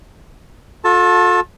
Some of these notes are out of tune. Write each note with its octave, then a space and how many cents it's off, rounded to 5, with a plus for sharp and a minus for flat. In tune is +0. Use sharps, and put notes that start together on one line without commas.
F4 +45 A4 +0 A5 +0